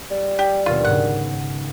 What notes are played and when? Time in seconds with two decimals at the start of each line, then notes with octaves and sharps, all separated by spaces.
0.11 G3
0.39 G4
0.66 D#2 B2 F4
0.85 G#2 C#3 F#5